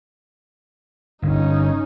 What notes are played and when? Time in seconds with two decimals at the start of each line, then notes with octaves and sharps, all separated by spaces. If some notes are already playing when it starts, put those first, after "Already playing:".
1.22 G1 C#4 D#4